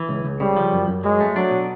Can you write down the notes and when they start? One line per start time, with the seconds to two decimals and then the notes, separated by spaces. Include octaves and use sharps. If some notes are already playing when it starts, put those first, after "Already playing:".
Already playing: E3
0.09 C#2
0.25 C#2
0.40 C#3 G3
0.57 F3
0.73 F#2
0.88 F#2
1.03 F#3 G#3
1.20 A3
1.36 F#3 D4
1.51 B2